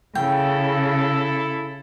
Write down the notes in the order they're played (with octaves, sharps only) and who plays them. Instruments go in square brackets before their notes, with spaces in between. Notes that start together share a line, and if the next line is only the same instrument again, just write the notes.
[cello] C#3 [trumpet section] E4 A4 [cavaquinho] G5